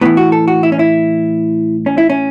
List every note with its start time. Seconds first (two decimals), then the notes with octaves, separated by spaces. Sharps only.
0.01 A2 E3 B3
0.17 F#4
0.32 A4
0.48 F#4
0.63 E4
0.72 C#4
0.79 E4
1.86 C#4
1.98 E4
2.10 C#4